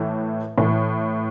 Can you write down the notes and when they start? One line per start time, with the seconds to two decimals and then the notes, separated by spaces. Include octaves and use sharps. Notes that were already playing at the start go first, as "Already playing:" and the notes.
Already playing: A2 E3
0.58 A2 E3